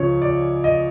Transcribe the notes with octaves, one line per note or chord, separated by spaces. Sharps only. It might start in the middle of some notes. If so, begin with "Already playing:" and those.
Already playing: C#2 C#3 F3 C#5
D5
D#5